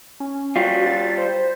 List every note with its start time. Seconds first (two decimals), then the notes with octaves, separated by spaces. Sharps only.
0.20 C#4
0.56 G3 F4 F#4
0.86 A6
1.18 C5